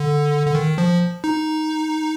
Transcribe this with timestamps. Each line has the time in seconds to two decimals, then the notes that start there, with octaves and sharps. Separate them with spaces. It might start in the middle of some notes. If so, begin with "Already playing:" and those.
Already playing: D3
0.47 D3
0.55 D#3
0.78 F3
1.24 D#4